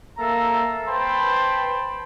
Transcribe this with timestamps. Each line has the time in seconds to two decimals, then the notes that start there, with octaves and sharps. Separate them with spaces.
0.18 A#3 A4 E5 F5 A#5
0.88 B4 C5 G5 A5 B5 C6